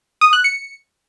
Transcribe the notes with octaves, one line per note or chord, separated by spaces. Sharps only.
D#6
F#6
C#7